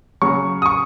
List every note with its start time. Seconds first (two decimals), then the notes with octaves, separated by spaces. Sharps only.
0.22 C#3 F#3 C#6
0.62 D#6
0.66 C#6